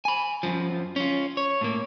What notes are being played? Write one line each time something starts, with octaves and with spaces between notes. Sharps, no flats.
G#5 B5
F#2 F3
C#4 F4
C#5
A2 A#3